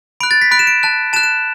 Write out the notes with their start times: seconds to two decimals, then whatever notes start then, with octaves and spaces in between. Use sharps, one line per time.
0.20 B5 F#6 D7
0.31 A6
0.42 B6
0.51 B5 F#6 D7
0.59 E7
0.67 D7
0.83 A5 F#6
1.13 A5 E7
1.16 F#6
1.23 E7